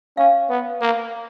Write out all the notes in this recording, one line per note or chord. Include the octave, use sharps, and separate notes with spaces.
C#4 F5
B3
A#3